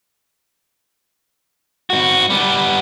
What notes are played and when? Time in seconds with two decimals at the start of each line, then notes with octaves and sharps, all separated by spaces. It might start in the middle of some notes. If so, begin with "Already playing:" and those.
1.90 G#2 F#4
2.30 G3 B3